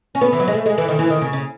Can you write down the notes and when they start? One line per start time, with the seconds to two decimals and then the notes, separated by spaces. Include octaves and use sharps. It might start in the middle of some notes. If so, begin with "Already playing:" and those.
0.15 C#4
0.21 B3
0.33 E3
0.40 F#3
0.48 G#3
0.54 A3
0.66 G#3
0.78 E3
0.88 D#3
0.99 E3
1.10 D#3
1.22 C#3
1.33 C#3